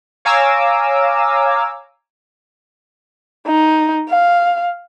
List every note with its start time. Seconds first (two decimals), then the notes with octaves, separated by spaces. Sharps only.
0.25 C#5 F5 G#5 A#5 D6 E6
3.47 D#4
4.09 F5